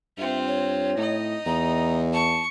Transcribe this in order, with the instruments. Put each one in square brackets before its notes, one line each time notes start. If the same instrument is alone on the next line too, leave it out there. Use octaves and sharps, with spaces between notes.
[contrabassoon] G2 [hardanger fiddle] C4 F4 [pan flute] E5
[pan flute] C#5
[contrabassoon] A2 [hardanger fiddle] D#4 D#5
[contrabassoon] E2 [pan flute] A#5
[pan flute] A5 [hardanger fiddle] C#6